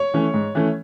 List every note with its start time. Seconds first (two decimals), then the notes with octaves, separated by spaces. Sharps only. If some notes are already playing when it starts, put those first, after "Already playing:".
Already playing: C#5
0.14 E3 A3 C#4
0.34 G#2
0.55 E3 A3 C#4